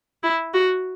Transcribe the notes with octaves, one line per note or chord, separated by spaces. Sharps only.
E4
F#4